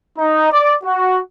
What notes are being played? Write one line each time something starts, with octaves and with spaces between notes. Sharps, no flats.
D#4
D5
F#4